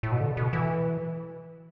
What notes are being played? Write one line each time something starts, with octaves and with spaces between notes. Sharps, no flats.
A2
B2
D3
B2
E3